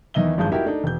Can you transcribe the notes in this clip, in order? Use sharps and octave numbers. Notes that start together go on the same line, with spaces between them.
E2 D#3 E3 D#5 E5 G7
G#1 G2 F3 G#3 D#4 G6
D#4 E4 F#4 G4 A#4 E5
A3 D4 D#4
E1 G6